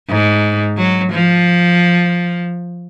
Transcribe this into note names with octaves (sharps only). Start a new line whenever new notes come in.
G#2
F#3
F3